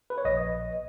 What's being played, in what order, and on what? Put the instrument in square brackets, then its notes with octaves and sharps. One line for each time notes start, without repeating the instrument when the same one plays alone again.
[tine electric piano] B4
C#5
A#1 D#5